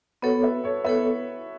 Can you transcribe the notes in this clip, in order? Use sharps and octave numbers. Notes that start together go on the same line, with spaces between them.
B3 F#4 A4 B4 C#5
B4 E5
A4 C#5
B3 A4 B4 C#5 E5